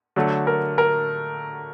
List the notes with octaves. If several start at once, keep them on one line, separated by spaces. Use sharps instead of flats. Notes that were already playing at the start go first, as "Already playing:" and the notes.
D3 F#3 A3
A#4
A#4